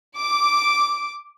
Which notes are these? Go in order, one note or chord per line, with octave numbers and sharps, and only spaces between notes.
D6